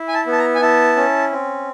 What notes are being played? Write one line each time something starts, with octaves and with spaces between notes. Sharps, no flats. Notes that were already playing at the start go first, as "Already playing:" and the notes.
Already playing: E4
G#5
A5
B3
A5
A#5
G#5
E4 A5
C#4
C4